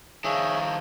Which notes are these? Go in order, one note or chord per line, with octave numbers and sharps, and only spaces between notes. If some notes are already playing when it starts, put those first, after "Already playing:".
D#3 F3 G#4 C#5 E5